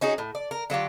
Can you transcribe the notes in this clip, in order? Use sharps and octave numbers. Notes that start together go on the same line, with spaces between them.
C#4 D#4 F#4 G#4
A2
D5
A#4
D3 F#3 F4 G4